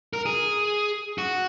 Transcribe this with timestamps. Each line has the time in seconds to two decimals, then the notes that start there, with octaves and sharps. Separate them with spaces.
0.13 A#4
0.26 G#4
1.18 F#4